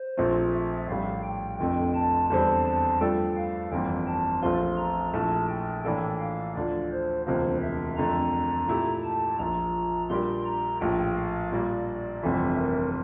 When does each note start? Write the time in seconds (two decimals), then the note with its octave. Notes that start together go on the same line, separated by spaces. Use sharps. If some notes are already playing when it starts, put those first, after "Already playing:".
Already playing: C5
0.17 A#1 A#2 F3 A3 C4
0.52 E5
0.88 A#1 A2 G3 F5
1.23 G5
1.59 F1 F2 D3 A3 G5
1.94 A5
2.30 E2 D3 G3 C4 A5
2.66 A5
3.00 G2 F3 A3 D4 A4 G5
3.37 F5
3.72 G1 F2 E3 A#3 G5
4.07 A5
4.42 A#1 A#2 A3 C4 F4 C6
4.78 A#5
5.13 A#1 A#2 A3 E4 A5
5.48 G5
5.84 A2 E3 A#3 D4 A4 G5
6.20 F5
6.55 D2 D3 F3 D5
6.91 C5
7.26 E1 D2 C3 F3 A#3 C5
7.62 E5
7.97 F2 D3 A3 A#5
8.68 A#2 A3 E4 G4
9.04 A5
9.39 A#1 A#2 F3 A#5
10.10 A#2 G3 D4 G4 A#4 C6
10.46 A#5
10.80 A#1 A2 F3 A#3 F4 G5
11.17 F5
11.52 A#2 G3 A#3 D5
11.88 D5
12.23 G1 F2 C3 E3 A3 E5
12.58 A#4